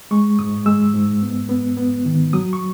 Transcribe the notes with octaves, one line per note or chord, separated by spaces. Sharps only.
G#3 C#6
G#2 D#6
G#3 E6
G#2
B3
B3
B3
D#3
F#3 D#6
C#6